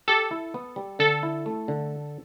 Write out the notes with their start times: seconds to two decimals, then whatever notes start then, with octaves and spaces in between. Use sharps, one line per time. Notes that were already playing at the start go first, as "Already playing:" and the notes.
0.08 G4 A4
0.31 E4
0.54 B3
0.76 G3
0.99 D3 A4
1.23 E4
1.46 A3
1.68 D3